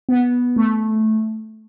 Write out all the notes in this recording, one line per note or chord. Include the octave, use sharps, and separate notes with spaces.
B3
A3